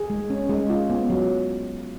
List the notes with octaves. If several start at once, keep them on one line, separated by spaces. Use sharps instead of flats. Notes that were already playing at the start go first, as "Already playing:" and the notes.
Already playing: G#4
G#3
C#4
G#3
F4
B3
F#3